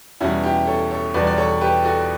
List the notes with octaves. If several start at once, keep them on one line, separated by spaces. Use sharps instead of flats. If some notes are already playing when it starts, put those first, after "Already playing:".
E2 B2 G3 C#4 E4
E4 G4
A4 C#5
A4 C#5
E2 B2 G3 B4 D5
D5
A4 C#5
G4 B4
F#4 A4